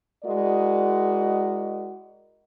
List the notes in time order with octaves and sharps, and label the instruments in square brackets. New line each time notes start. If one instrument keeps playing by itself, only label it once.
[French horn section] G#3 E4 F#4 A#4 D5 D#5